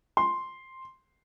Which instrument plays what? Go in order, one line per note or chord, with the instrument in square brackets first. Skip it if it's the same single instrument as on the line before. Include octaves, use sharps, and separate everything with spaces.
[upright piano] C6